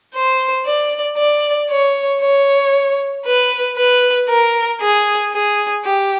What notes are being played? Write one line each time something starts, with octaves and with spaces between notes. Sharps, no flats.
C5
D5
D5
C#5
C#5
B4
B4
A#4
G#4
G#4
G4